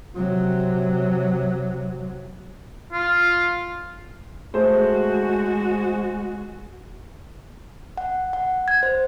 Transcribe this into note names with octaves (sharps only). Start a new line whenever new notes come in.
C3 F#3
F4
G#3 A3 F#4 G#4 C5
F#5
F#5
G#6
C5